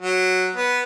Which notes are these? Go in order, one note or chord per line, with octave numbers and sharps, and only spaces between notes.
F#3
B3